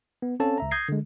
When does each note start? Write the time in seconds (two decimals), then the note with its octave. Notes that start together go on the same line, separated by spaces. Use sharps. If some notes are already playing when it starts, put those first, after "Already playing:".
0.22 B3
0.40 C4 C#4 A4 C#5 F5 A5
0.58 C#2 E5 A#5
0.71 D#6 G6 G#6 A#6 C7
0.89 D3 G#3